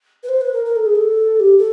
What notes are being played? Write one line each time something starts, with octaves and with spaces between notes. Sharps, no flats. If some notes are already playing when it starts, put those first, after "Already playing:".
B4
C5
B4
A#4
A#4
A4
G#4
A4
G4
A4